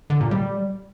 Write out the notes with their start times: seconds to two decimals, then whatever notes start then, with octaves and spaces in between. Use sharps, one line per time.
0.10 D3
0.21 A#2
0.31 G3